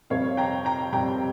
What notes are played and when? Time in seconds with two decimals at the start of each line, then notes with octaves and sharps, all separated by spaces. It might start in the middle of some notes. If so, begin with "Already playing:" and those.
0.10 F2 C3 G3 C4 C#5 F5
0.37 G5 A#5
0.65 G5 A#5
0.92 F2 C3 G3 C4 G5 A#5